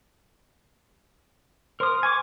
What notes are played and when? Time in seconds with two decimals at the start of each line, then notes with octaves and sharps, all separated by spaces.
1.80 A#4 C5 C6 D#6 F6
2.03 G#5 C#6 D6